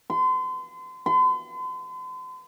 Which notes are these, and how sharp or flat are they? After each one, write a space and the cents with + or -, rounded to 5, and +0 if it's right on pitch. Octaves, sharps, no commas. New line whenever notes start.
C6 -35
C6 -45